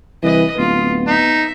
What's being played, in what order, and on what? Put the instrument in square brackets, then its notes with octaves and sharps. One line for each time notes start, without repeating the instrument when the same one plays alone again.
[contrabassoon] C2 [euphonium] E3 [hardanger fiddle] B4 D#5
[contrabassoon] D1 [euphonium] B3 [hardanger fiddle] F4
[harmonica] D#4 [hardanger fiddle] E5